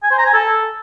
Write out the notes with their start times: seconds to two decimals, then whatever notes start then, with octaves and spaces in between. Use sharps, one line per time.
0.04 G#5
0.11 C5
0.19 A#5
0.26 G#5
0.34 A4